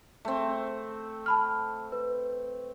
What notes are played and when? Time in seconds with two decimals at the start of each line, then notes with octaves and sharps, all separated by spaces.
0.25 A3 C4
1.26 A5 B5 F6
1.92 B4